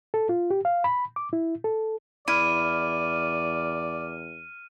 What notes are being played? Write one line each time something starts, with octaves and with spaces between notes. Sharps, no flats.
A4
F4
G4
F5
B5
D6
E4
A4
E2 E4 D5 F6 D#7